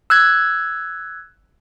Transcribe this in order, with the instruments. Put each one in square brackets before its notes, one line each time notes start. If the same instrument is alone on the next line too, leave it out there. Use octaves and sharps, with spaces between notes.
[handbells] E6 F#6 G#6